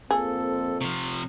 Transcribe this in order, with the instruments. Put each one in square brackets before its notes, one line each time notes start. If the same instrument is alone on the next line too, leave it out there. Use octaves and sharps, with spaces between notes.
[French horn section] F2 A#3 C4 [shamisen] G#4 [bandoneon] A4
[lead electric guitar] C3 F3 [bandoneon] C#6